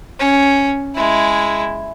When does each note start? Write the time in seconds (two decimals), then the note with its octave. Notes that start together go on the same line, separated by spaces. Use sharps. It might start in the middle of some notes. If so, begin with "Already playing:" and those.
0.20 C#4
0.95 G#3 E4